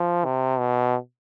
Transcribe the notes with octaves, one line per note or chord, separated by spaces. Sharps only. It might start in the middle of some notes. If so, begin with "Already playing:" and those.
Already playing: F3
C3
B2